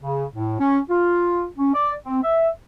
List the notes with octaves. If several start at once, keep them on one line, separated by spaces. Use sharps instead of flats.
C#3
A2
C#4
F4
C#4
D5
C4
E5